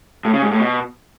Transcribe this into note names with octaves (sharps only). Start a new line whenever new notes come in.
A2
C#3
G#2
A2
B2